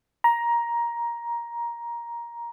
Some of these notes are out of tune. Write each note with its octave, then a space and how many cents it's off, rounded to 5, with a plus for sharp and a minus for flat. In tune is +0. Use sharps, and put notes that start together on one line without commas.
A#5 +15